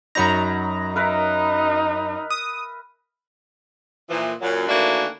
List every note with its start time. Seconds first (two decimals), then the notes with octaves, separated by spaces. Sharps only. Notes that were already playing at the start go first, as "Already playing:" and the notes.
0.15 F#2 F#3 D#4 A#5 B5
0.96 D#4 A#4 B4 E5
2.30 D#6
4.10 A#2 E3 F3
4.41 F#2 A#2 F#3
4.69 D#3 E3 A3 A#3 D4 F#4